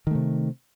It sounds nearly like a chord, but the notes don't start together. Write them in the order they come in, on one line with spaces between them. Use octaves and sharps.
D#3 A3 C3